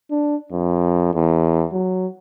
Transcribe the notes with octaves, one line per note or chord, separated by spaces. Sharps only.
D4
F2
E2
F#3